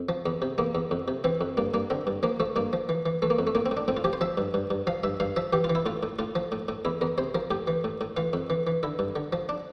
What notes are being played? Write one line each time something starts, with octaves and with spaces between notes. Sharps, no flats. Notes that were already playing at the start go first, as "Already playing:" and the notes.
Already playing: F2
F3
E2
C3
E2 A#3
E2
F2
C3
E3 C4
F2
G2 A#3
G2 A#3
D3 C4
G2
F3 A#3
F3 A3
G2 A#3
F3
E3
E3
E3 A3
A#3
F2
A3
A2 A#3
C4
A2
D4
A2 C4
F4
F3 G4
C5
F3 E5
G2
G2
G2
F3 F5
G2 E5
G2 F5
F3 E5
E3 G4
F4
E3
E4
A2 F4
A2
A2 F4
F3
A2
A2
E2 E4
E2 A#4
C3 C5
F3 A#4
A2 G4
E3
A2
A2
E3 F4
F2
E3
E3
D3 E4
G2
D3
F3
D4